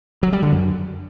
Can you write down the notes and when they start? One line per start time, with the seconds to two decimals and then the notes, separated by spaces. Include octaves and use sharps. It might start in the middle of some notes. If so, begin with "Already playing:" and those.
0.23 F#3
0.33 G3
0.42 D3
0.52 F#2